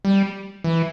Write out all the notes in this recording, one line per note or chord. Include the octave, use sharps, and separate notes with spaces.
G3
E3